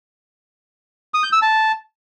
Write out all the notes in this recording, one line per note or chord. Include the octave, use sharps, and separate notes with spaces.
D#6
G6
E6
A5